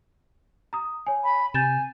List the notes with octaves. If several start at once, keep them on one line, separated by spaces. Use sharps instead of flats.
A#5 D#6
C#5 G#5
B5
C3 G#5 G6 A6 E7